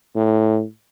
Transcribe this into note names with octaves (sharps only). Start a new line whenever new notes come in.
A2